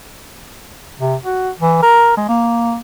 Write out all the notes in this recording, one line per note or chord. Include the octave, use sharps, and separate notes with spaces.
C3
F#4
E3
A#4
G#3
A#3